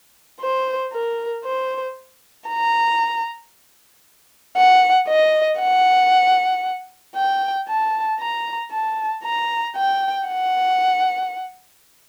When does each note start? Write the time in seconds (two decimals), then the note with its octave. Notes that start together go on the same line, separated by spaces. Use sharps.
0.41 C5
0.93 A#4
1.44 C5
2.48 A#5
4.57 F#5
5.08 D#5
5.59 F#5
7.16 G5
7.68 A5
8.20 A#5
8.72 A5
9.24 A#5
9.76 G5
10.28 F#5